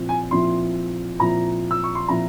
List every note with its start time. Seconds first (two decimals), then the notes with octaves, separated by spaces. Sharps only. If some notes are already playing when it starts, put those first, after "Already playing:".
Already playing: A#2 F3 C4 E4
0.09 G#5
0.31 A#2 F3 C4 E4 C6
1.19 A#2 F3 C4 E4 A#5
1.71 E6
1.84 C#6
1.95 C6
2.08 A#2 F3 C4 E4 A#5